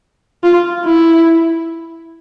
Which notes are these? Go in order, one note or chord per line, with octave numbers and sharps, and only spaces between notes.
F4
E4